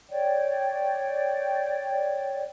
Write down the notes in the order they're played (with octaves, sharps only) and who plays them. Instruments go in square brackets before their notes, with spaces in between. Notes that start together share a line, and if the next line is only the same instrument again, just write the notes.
[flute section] C#5 D5 G5